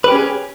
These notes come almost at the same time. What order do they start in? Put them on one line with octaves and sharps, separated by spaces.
B4 G4 C#4 G#4